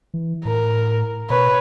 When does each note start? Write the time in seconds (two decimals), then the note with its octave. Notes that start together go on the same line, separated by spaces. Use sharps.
0.14 E3
0.45 A2 A#4
1.30 B2 B4 C#5